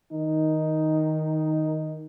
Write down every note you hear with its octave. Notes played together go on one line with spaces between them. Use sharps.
D#3 D#4